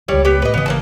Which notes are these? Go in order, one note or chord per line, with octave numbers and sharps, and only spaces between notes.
E1 C#2 G3 C#5 D5
B3 G4
A2 B4 D#5
G#1 C#3 E3 B3 D#5
A#3 C4 A5